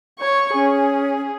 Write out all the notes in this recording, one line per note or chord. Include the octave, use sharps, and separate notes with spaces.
C#5 C#6
C#4 G#4